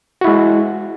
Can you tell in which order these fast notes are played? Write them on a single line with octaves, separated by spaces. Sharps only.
F#4 E4 G#3